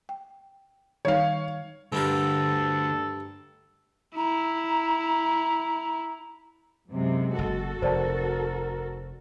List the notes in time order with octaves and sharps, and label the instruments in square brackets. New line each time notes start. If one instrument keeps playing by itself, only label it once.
[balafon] G5
[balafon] D#3 G3 D#4 [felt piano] C#5 F5
[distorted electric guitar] D2 [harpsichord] G2 G3 A#4 [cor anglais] A4
[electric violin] E4 [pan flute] A#5
[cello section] F#2 C3 [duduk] G#3
[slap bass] F#1 [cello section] F#4 A4
[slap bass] F1 [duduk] A#4 [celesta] C5 D5 A5